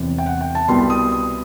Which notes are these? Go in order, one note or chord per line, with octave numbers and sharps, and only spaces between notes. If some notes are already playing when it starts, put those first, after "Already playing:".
Already playing: E1 E2 C3
G5
F#5
G5
A5
C2 B2 G3 B3 C6
D#6
D#6